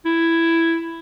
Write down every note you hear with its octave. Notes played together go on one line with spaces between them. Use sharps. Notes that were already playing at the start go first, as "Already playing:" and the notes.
E4